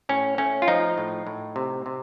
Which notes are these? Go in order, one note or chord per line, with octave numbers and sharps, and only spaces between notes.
A2 C#4
A3 C#4
F4
F3 D#4
A2
A2
C3
C3